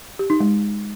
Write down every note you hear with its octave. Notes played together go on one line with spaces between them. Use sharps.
G4
D#4
G#3